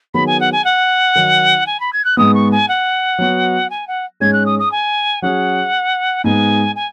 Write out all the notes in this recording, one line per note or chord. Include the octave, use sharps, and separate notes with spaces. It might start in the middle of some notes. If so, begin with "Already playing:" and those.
D#3 F#3 B3 G#4 B5
G#5
F#5
G#5
F#5
D#3 F#3 D#4
G#5
B5
G#6
F#6
G#2 G#3 B3 D#6
C#6
G#5
F#5
F#3 B3 F#4
G#5
F#5
G#2 G#3 C#4 G#4 G#6
F#6
D#6
D#6
G#5
F#3 C#4 G#4 F#5
G#2 G#3 B3 G#5
G#5